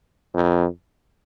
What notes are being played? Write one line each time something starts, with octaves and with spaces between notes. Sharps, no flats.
F2